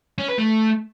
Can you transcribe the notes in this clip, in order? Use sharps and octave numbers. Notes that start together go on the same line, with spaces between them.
C#4
B4
A3